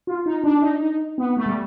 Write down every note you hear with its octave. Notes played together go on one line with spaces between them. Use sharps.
F4
D#4
D4
D#4
D#4
B3
A3
G3